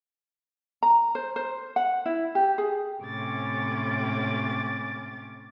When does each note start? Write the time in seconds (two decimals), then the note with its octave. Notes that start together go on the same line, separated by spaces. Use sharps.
0.83 A#5
1.15 C5
1.36 C5
1.76 F#5
2.06 E4
2.35 G4
2.58 G#4
3.02 A2 C3 C#4 D6 A6